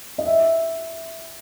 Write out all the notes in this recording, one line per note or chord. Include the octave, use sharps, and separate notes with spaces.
D#5
E5